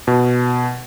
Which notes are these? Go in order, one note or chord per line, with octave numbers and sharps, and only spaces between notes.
B2